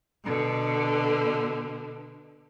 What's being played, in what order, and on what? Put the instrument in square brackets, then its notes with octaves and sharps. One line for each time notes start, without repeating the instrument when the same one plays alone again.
[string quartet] B2 D3